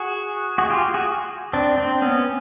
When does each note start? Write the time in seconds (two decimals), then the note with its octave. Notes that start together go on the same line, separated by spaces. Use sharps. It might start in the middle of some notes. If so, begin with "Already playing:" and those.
Already playing: F#4 G#4
0.58 F#4 G#4
0.70 F4 G4
0.94 F#4 G#4
1.53 C4 D4
1.78 C4
2.02 B3 C#4